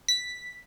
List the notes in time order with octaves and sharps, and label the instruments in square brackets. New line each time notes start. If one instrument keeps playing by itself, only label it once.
[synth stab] B6